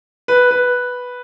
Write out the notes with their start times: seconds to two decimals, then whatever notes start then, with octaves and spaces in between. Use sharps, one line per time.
0.28 B4
0.51 B4